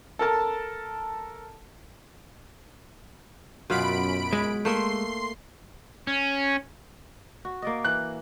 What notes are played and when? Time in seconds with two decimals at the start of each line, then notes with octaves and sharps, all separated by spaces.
0.19 A4 A#4 A5
3.70 F#2 B2 F4 F5 B5 D7
4.33 G#3
4.65 A3 A#3 E5 C6 C7
6.07 C#4
7.45 F#4
7.62 A#3 D5 D#5
7.84 E3 F#6